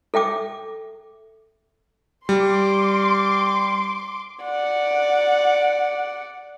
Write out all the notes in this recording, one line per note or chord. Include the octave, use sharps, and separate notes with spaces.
A4 E5 G5 D6
G3 C6 D6
D5 F#5